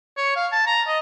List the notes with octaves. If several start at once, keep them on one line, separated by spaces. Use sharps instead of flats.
C#5
F5
A5
A#5
D#5